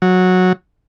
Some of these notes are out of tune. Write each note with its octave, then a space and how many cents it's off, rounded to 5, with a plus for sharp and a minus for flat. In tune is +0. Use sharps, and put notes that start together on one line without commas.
F#3 -10